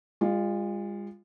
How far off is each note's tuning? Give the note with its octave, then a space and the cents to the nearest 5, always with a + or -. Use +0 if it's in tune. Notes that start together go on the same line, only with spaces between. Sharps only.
G#3 -40 F4 +0